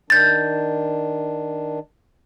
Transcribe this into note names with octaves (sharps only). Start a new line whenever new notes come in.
D#3 D4 G6 A6